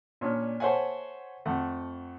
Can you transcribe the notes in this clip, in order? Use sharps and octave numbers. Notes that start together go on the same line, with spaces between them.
A#2 C#4 D4
A4 C5 C#5 E5 F#5 G#5
F2 A3 F#5